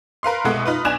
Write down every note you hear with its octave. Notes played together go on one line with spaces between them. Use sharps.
A#4 B4 F5 C6
C2 B2 G#3 B3 A4 F#6
D#4 F4 B4
B1 D4 G#5 F#6 E7 F7